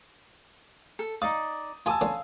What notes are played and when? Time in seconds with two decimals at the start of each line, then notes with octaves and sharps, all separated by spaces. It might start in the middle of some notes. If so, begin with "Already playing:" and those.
0.99 A4
1.22 D#4 D5 F5 D#6
1.86 F4 G4 G#5 A5 D#6 E6
2.01 D3 C#4 F4 F5